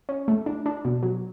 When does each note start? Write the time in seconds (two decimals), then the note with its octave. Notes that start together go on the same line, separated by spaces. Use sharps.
0.09 C#4
0.28 A3
0.46 D4
0.66 D4
0.85 B2
1.03 F#3